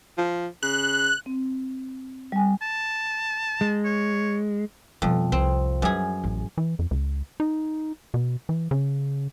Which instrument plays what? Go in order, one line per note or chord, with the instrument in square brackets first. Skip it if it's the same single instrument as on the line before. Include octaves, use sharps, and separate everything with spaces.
[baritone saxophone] F3
[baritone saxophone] C#3 [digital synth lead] F#6
[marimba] C4
G3 G#5
[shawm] A5
[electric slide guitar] G#3
[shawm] C#5
[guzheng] F2 [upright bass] B2 G3
[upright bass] C2 [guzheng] C4
[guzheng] F#2 G#4 [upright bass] G3
[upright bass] A1
[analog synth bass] E3
F2
C#2
D#4
B2
E3
C#3